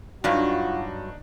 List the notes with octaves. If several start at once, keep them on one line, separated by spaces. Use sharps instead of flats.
G2 F#3 D4 D#4 F4 F#4